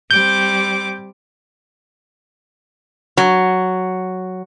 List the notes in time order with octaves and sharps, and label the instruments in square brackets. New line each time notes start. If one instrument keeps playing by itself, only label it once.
[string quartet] G3 C4 D6 [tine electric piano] G6
[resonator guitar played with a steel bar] F#3